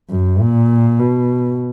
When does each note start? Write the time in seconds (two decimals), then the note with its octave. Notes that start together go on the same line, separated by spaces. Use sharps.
0.10 F#2
0.40 A#2
0.99 B2